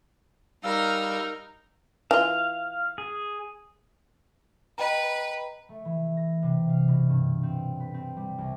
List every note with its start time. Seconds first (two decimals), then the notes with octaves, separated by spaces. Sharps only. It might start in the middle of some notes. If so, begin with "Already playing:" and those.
0.64 G3 D#4 A#4 F5 E6
2.11 E3 F4 F5
2.98 G#4
4.78 B4 D#5 G5 A#5
5.69 A3
5.85 E3
6.17 A#6
6.43 C3
6.69 F5
6.88 B2
7.09 G2
7.43 C4
7.80 B4
7.94 C4
8.17 G3
8.38 C2